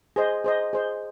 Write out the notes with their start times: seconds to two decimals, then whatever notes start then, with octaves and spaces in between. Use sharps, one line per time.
0.16 G#4 C5 D#5
0.44 G#4 C5 D#5
0.73 G#4 C5 D#5